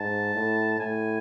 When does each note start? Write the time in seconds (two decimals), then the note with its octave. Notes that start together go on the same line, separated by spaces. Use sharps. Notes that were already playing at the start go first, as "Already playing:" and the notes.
Already playing: G#2 A5
0.35 A2
0.79 A2 G#5